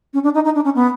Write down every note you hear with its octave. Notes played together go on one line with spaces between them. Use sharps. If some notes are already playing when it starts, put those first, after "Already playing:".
C#4
D4
D#4
D#4
D4
C#4
B3